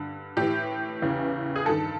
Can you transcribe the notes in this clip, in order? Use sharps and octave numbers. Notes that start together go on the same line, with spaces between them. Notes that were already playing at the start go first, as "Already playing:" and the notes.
Already playing: G2 D3
A2 E3 G4
E2 C#3 E3
G#4
G2 D#3 A4